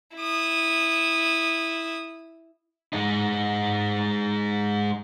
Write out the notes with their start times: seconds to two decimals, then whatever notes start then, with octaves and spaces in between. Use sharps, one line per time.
0.16 E4 D#6
2.93 G#3 D#4